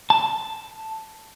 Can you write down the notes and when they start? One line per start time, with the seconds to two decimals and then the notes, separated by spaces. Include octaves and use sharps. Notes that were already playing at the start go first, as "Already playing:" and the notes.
0.10 A5